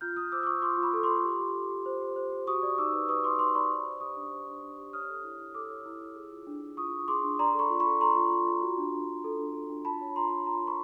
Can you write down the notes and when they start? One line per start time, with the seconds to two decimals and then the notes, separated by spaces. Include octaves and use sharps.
0.01 F4 F6 G6
0.16 F4 D#6 F6
0.32 C5 D6 E6
0.43 D6
0.47 F4 C#6 D#6
0.62 F4 C6 D6
0.77 F4
0.83 B5 C#6
0.93 A4
1.03 C6 D6
1.09 F4
1.24 G4
1.40 G4
1.55 G4
1.70 G4
1.86 C5
2.01 G4
2.16 C5
2.32 G4
2.47 F#4 C#6 D#6
2.63 D5
2.78 D#4 D6 E6
2.93 B4
3.09 B4 C#6 D#6
3.24 B4 C6 D6
3.39 D#4 C6 D6
3.55 D5 B5 C#6
3.70 C5
3.86 C5
4.00 G4 C#6 D#6
4.16 D4
4.31 C5
4.47 D4
4.62 D4
4.78 G4
4.93 C#5 D#6 F6
5.09 A4
5.24 E4
5.39 E4
5.54 A4 D6 E6
5.70 C#5
5.86 E4
6.01 E4
6.16 G#4
6.31 F4
6.47 D4
6.62 D4
6.77 F4 C#6 D#6
6.93 F4
7.08 G#4 C6 D6
7.24 D4
7.39 D5 A#5 C6
7.54 A4
7.59 B5 C#6
7.70 F4
7.80 B5 C#6
7.85 A4
8.01 A4 A#5 C6
8.16 F4
8.32 F4
8.47 F4
8.62 F#4
8.78 D4
8.93 D4
9.08 D4
9.24 A4
9.39 D4
9.54 A4
9.70 D4
9.85 F4 A5 B5
10.01 C#5
10.16 F4 A#5 C6
10.31 F4
10.46 F4 A#5 C6
10.63 A#4 B5 C#6